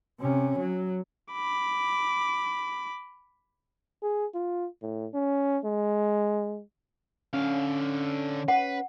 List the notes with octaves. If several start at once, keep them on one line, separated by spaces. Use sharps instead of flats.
C3 C#4
F#3
B5 D6
G#4
F4
A2
C#4
G#3
D3 C#4 F5
B4 F#5